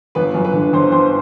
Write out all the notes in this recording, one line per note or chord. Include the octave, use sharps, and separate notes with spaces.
G1 B4
F#2
B4
D3
G1 C5
G1 C5